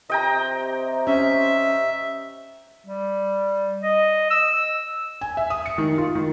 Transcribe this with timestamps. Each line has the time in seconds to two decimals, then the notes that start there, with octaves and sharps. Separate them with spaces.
0.10 C3 D#5 G5 A#5
1.07 C#4 E5
2.87 G3
3.83 D#5
4.31 E6
5.21 G#5
5.37 E5
5.50 D#6
5.66 C#7
5.78 D#3
5.98 F4
6.15 D#3